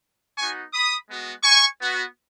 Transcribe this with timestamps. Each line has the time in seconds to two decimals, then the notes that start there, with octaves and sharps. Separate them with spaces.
0.38 B3 D#4 F#4 G#5 C#6
0.73 B5 D#6
1.08 G#3 B3 F#4
1.44 G#5 C#6
1.80 B3 F#4